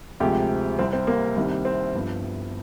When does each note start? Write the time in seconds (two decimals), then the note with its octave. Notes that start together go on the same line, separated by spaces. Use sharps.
0.20 D2 C3 F3 G#3 G4
0.79 C2 C3 G3 C4
0.93 C4
1.07 A#3
1.36 C2 C3 D#3 G3
1.65 C4
1.94 G1 G2 F3